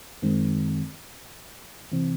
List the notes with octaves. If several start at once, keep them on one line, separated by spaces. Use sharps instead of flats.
F#2 D#3 G#3 C4
C3 E3 C4